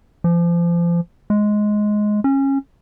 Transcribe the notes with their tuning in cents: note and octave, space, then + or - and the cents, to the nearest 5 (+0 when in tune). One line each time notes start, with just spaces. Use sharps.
F3 -30
G#3 +10
C#4 -20